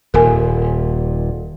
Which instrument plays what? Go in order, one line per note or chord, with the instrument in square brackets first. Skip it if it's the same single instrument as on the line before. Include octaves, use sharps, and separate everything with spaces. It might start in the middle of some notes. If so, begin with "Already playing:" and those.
[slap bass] D#1 A#2 [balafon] A#4 G#5